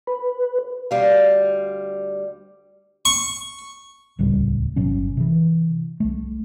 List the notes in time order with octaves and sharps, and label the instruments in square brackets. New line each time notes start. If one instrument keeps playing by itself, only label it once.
[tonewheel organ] B4
[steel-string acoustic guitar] D2 G3 F5
[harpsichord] C#6
[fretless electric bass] D#1 C#2 A2 G3
G1 C3 F#3 C#4
C3 E3
C2 A3